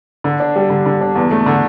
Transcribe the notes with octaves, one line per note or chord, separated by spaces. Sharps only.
D3
D4
G3
D3
D3
D4
E2
A3
D3